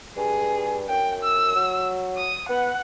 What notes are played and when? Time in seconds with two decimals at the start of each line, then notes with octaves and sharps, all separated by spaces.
0.16 G2 G#4
0.89 F#2 G5
1.23 E6
1.55 F#3
2.17 D#6
2.49 B3 F#5